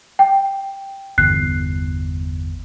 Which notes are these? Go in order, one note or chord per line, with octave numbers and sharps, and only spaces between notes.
G5
G1 E2 F#6 C7